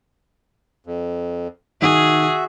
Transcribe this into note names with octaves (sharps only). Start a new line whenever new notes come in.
F2
D#3 F#4 G#4 E5